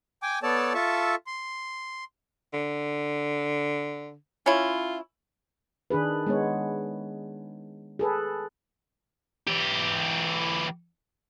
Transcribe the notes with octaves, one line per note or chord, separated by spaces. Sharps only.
G5 G#5 D6
B3 A4 C#5 D5 A5
F4 A4 E5 A5 C#6
C6
D3
C#4 E4 F4
D#3 D4 G#4 B4
G#3 B3 C#5
G#4 A4 B4
E3 G4